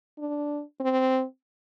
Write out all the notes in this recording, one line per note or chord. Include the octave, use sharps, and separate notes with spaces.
D4
C4